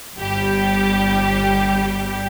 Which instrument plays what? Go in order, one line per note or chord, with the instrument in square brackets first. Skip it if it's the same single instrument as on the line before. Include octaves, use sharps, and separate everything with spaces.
[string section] G1 G3 G4